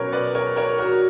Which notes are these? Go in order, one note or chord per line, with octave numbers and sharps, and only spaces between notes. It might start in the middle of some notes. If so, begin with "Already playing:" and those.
Already playing: B2 F#3 C#4 A#4 B4 C#5
B4 D5
A#4 C#5
A#4 C#5
F#4 A#4